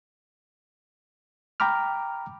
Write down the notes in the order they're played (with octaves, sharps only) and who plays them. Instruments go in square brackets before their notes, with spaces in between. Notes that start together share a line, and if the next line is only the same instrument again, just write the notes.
[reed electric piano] G5 A#5 B5 D6 F6